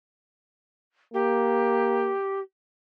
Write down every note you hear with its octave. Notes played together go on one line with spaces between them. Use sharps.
A#3 G4